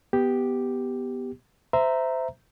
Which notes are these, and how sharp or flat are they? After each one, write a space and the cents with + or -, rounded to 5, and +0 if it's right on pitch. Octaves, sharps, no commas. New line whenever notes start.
B3 +0 G4 +0
C5 -20 E5 +5 A#5 +0